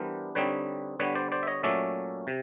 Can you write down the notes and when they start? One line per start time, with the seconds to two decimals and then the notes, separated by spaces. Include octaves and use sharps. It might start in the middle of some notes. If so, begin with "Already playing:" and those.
Already playing: E3 G3 B3 D4 A#4 C5
0.35 D3 G3 C4 D#4 B4 C#5
0.99 D3 G3 B3 B4 C#5
1.15 C5 D5
1.32 C5 D5
1.43 E5
1.47 C#5 D#5
1.63 A#2 F#3 A3 C#4 D5 E5
2.27 C3